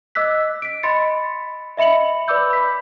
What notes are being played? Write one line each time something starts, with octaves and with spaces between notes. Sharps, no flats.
D#5 D6 E6 F#6 B6
B6 D7
D#5 B5 C6 A6 C#7
D#5 E5 B5 C#7 F#7
B4 D5 B5 D6 E6 G6
B5 B6